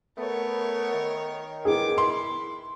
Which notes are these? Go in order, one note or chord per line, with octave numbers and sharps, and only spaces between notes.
A3 B3 A#4 C#5
D#3
B3 G#4 D6
E4 C6